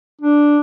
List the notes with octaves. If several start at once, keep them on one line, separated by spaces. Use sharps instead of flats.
D4